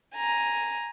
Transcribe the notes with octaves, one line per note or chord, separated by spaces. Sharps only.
G#5 A#5